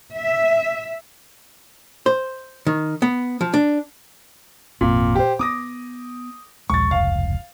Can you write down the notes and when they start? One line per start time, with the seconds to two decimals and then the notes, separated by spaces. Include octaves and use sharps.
0.15 E5
2.06 C5
2.67 D#3
3.02 B3
3.41 F3
3.54 D4
4.81 G#1 F2 A#2 C4
5.15 G4 C5
5.39 B3 D6 D#6 A#6
6.70 A#1 D#2 G#3 C#6 A6
6.91 F1 C#2 G2 F5